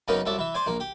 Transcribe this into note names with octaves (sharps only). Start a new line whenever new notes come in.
F#2 C#3 A#3 B3 C#4 D#4
C2 F#3 E5 A5 D6
E3 E5
C5 D5 G#5
A#1 A#3
G4